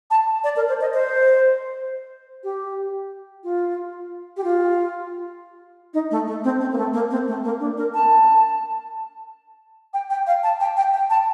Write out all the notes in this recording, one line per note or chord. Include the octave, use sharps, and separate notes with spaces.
A5
D5
A#4
C5
D#5
C5
G4
F4
G4
F4
D#4
A3
A3
C4
C4
A#3
A3
A#3
C4
A3
A#3
D4
A#4
A5
G5
G5
F5
A5
G5
G5
G5
A5